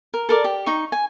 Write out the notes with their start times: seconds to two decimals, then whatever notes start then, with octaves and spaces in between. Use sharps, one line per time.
0.14 A#4
0.29 A4 A#4 D5
0.44 G4
0.66 D#4 C#6
0.92 G#5